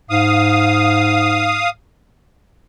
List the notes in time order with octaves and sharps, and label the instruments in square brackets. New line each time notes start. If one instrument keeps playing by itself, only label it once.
[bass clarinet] G#2 [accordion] F5 D#6